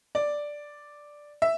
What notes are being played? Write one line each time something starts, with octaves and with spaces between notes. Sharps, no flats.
D5
E5